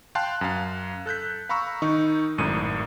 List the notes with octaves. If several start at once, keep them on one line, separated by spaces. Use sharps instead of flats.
F5 G5 A5 C6 F#6
F#2 F5
A4 F#6 G6 B6
F5 A#5 B5 C#6 E6
D#3 D#4 C#6
G#1 F#2 A2 D#7